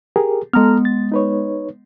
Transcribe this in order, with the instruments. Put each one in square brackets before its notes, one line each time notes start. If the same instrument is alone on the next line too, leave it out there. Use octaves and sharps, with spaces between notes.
[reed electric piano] G4 G#4 A#4
[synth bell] G#3 B3 [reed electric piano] A4 A#5 F6
[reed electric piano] A6
D#4 B4 C#5